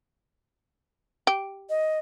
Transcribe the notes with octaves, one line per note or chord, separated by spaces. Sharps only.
G4
D#5